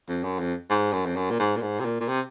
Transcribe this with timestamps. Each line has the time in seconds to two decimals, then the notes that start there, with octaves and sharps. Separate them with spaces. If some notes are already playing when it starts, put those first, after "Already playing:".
0.08 F2
0.23 F#2
0.39 F2
0.70 G#2
0.93 F#2
1.06 F2
1.16 F#2
1.30 A#2
1.39 G#2
1.57 A#2
1.62 G#2
1.80 C3
1.85 A#2
2.00 A#2
2.08 C3